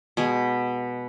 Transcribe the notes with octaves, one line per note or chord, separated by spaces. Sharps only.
B2 G#3 G#5